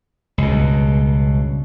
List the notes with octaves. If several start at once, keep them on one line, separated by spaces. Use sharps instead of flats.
C#2 G2 B2